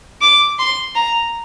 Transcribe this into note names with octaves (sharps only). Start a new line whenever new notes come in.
D6
C6
A#5